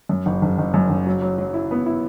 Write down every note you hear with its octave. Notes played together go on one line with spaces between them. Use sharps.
F#2
F#1
F#1
F#1
F#2
F#1
F#3
F#3
F#3
E4
B3
E4